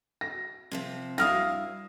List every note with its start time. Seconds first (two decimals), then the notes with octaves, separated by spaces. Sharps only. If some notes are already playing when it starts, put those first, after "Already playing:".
0.21 A#6
0.72 C3 F3 C4
1.18 G2 E4 F5 D#6 F6 A#6